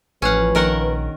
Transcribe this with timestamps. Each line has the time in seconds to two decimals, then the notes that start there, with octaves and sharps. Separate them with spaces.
0.22 A1 F3 C#4 B4 F5 F#5
0.55 A#1 D#3 A#4 F#5